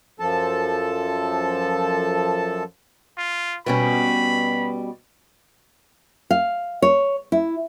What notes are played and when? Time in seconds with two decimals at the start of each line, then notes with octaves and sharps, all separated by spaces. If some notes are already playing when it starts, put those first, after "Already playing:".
0.20 F#2 F3 A4 A5
3.17 F4
3.66 B2 G3 C#4 B5
6.31 F5
6.82 C#5
7.32 E4